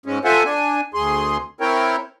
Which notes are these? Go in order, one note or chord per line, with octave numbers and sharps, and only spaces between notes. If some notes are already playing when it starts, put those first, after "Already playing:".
G#2 G#3 C#4
F4 A4 C5 E5 F#5 G#5
D4 G#5
D2 G#4 C6
C4 E4 A#4 C#5 G5